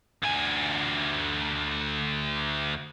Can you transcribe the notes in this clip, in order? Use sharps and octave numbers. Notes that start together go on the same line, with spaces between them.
D2 G#5